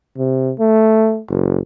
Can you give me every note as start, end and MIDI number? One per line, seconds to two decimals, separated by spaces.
0.18 0.52 48
0.59 1.20 57
1.29 1.59 30